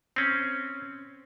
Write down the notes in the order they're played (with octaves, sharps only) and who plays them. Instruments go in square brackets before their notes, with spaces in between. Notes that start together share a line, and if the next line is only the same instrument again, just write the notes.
[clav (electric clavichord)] C4 C#4